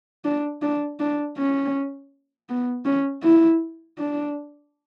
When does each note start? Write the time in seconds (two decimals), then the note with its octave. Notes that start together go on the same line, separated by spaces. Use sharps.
0.25 D4
0.62 D4
1.00 D4
1.37 C#4
2.49 B3
2.85 C#4
3.23 E4
3.98 D4